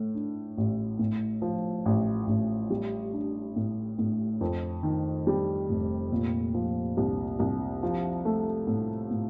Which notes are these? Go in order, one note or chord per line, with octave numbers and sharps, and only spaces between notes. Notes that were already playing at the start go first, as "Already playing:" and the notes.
Already playing: A2 A3
D4
A1
A2
F3
A1
A1
G3
D4
A2
A2
F2
D#3
G3
F1
A#2
F3
C2
C2
F3
A3
A2
A2